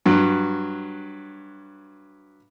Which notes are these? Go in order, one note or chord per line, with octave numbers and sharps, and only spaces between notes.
G2 F#3